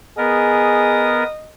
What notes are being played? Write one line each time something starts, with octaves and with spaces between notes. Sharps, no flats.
B3 G#4 A#4 D#5